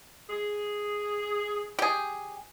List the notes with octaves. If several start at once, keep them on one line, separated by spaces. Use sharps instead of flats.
G#4
G4 G#4